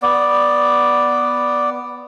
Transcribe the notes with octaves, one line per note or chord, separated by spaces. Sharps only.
B3 D5